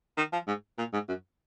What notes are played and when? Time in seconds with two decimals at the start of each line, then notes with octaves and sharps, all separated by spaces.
0.17 D#3
0.33 F3
0.48 G#2
0.78 A#2
0.93 G#2
1.08 F#2